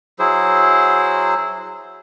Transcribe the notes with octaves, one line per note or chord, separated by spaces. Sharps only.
F#3 E4 G#4 C5